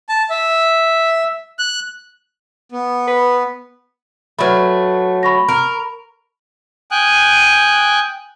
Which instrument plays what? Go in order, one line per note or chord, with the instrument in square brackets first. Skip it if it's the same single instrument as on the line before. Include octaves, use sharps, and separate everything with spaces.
[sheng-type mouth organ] A5
E5
F#6
B3
[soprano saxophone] B4
[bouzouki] F#3 A3 [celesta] B4 B5
[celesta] B5 C#6 A#6
[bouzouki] A#4
[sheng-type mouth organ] G5 G#5 D#6 F#6